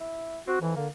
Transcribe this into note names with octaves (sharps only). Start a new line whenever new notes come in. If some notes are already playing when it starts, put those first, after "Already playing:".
E4
C4 F#4
F2 E3
D3 A#3